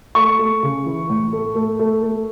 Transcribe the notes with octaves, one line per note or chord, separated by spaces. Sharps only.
A3 C#6
A3
C#3
E3
A2
A3
A3
A3
A3